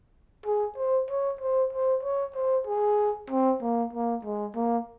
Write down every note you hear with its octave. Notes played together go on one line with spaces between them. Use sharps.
G#4
C5
C#5
C5
C5
C#5
C5
G#4
C4
A#3
A#3
G#3
A#3